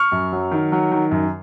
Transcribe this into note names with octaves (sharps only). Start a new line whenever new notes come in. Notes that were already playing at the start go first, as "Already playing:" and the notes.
Already playing: C#6 F6
F#2
F#3
D#3
F#3
D#3
F#2